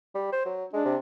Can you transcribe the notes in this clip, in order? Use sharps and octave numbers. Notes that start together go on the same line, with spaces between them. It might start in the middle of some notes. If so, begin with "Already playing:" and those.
G3
C5
F#3
G#3 D4
C3